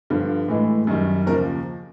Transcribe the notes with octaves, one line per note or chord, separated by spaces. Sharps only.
G2 D3 F3
A2 E3 G#3
F#2 D#3 G3
D#2 C#3 F3 A#4